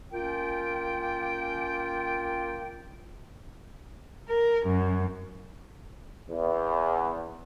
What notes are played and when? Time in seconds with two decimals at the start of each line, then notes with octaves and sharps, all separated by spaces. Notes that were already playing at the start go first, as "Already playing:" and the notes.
0.13 A#3 C#4 F4 G5
4.29 A#4
4.66 F#2
6.30 E2